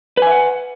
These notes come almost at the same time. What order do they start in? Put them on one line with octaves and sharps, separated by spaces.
B4 G#5 E5 F#5